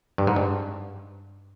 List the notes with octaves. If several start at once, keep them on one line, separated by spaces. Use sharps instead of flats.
G2
G#2
G2